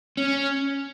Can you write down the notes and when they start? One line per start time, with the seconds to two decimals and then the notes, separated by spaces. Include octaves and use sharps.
0.17 C#4